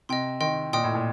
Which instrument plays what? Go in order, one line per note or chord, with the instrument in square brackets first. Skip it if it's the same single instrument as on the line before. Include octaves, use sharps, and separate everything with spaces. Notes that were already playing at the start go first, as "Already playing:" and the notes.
[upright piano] C3 [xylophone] D#5 G5 C6
[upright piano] D#3 [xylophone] D#5 G5 C6
[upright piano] A#2 [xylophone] D#5 G5 C6 D#6
[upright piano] A2
A#2